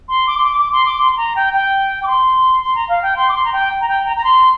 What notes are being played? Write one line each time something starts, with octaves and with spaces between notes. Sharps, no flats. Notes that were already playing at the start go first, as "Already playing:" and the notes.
C6
D6
C6
D6
D6
C6
D6
C6
C6
A#5
G5
G5
D6
C6
C6
A#5
F5
G5
C6
D6
C6
A#5
G5
A#5
G5
A#5
A#5
C6